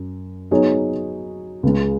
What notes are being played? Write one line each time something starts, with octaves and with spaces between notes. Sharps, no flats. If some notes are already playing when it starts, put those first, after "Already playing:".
Already playing: F#2
F#3 B3 D#4 G#4 C#5
C#2 C#3 G#3